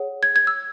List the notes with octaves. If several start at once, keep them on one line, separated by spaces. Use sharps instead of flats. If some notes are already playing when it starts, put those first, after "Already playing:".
Already playing: G#4 C#5 F#5
G#6
G#6
E6